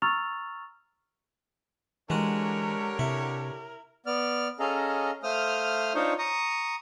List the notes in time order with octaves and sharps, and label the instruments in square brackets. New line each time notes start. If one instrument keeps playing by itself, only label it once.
[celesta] A#5 C#6 E6 F6 A6 F7
[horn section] D3 G4 C#5 [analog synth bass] E3 [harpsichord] G#3 F#4 [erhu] A#4
[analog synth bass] C3 [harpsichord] E4
[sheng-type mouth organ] B3 D5 F6
C#4 G#4 A4 D#5 F5 A#5
A3 C5 F5 D#6 F6
D4 D#4 F4 C5 C#5
A#5 C#6 D#6